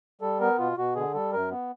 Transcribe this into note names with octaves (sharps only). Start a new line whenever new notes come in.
G3 A4
B3 A#4
B2 F4
B2 F#4
D3 G#4
G3 A4
F#2 A#4
B3